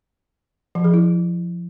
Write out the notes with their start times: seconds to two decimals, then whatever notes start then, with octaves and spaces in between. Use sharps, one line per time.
0.75 F3
0.84 G#4
0.94 E4